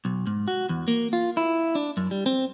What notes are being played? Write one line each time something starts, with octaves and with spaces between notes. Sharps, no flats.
B1
G#2
F#4
E2
A#3
F4
E4
D4
F#2
G3
C4